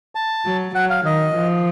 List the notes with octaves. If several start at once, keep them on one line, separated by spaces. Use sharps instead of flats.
A5
F#3
F#3 F#5
F5
D#3 D#5
F3